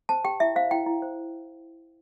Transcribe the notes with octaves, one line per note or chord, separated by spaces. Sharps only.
C5 A5
G4 G5
E4 E5
C5 F5
E4 G5
E4
C5